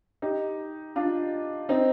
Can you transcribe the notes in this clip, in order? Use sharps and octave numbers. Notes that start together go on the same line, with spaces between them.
D#4 G4
D4 F4
C4 D#4